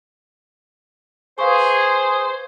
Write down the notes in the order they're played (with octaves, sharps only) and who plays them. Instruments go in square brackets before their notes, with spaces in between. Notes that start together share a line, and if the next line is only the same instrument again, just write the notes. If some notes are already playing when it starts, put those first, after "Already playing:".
[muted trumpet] G#4 [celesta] B4 F5 C#6 [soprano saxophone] C5